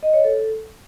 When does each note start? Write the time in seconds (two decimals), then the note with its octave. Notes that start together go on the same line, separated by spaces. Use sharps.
0.03 D#5
0.13 C#5
0.24 A4